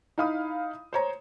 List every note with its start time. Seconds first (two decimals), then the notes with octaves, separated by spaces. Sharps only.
0.18 D#4 E4 F5 B5 D#6
0.93 C5 C#5 A#5